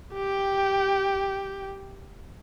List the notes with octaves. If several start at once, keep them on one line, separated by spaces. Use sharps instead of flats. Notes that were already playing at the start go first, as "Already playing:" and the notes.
G4 G5